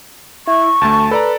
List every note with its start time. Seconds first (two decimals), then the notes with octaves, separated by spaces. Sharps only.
0.47 E4 C#6
0.81 D2 A3 A5
1.11 A4 B4 D5 A#5